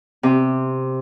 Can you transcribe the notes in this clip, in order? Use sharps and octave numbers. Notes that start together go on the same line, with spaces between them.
C3